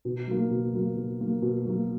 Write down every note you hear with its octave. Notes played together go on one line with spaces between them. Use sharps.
B2
F#3 A#3
B2
F#3 A#3
B2
F#3 A#3
B2
F#3 A#3